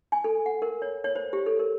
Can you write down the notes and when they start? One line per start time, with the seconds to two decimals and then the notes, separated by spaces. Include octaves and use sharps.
0.12 G#5
0.24 A4
0.46 F#5
0.62 A#4
0.82 C#5
1.04 C#5
1.16 C5
1.33 G4
1.46 A4
1.59 A#4